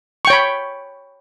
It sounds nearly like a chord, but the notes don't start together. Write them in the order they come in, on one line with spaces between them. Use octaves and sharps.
C#6 G5 C#5 B5